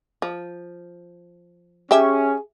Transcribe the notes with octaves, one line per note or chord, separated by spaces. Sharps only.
F3
C#4 G4 G#4 E5